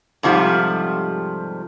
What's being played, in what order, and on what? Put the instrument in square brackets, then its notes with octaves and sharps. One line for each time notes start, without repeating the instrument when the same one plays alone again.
[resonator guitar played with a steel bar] G#2 C3 F3 G3 A3